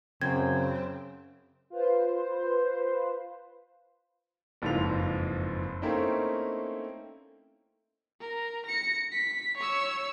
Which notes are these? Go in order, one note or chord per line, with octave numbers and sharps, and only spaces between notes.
F#2 C#3 C4 G#6
F4 B4 C5
F#1 F2 G#2 E3 F4 F7
A3 A#3 C4 C#4 D#4 E4
A#4
A#6 C#7
B6
C#5 E6